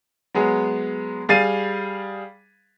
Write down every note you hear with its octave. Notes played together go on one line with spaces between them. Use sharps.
F#3 G#3 B3 G#4
G3 G#4 F5 A6 C7 D#7